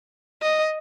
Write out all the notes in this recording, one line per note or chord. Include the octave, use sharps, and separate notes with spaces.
D#5